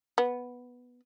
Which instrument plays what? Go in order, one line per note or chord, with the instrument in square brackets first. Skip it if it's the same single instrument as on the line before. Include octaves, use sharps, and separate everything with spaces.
[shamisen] B3